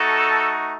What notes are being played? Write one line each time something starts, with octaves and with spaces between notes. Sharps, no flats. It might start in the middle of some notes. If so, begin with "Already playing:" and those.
Already playing: A3 D#4 F#4 A4